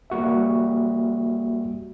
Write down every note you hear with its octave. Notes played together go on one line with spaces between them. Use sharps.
G3 A#3 F#4 E5